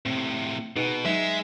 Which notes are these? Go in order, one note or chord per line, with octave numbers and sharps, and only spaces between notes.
A2 C3 C4
B2 D#4 G#4 B4
F#3 G#3 D#4 E5